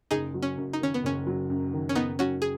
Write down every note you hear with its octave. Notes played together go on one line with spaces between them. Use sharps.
F#1 D#4 G#4
F#3
C#4
F#2
D#4
D#3 C#4
B3
F#1 C#4
F#3
F#2
D#3
C#4
F#1 B3 D#4
F#3 C#4 F#4
G#4